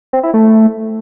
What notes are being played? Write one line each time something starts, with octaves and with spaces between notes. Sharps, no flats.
C4
E4
A3